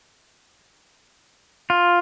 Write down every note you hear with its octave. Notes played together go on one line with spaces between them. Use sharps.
F4